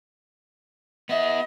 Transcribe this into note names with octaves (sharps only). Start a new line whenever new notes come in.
B3 D#5 E5